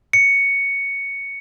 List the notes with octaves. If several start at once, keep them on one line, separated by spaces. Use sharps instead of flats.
C#7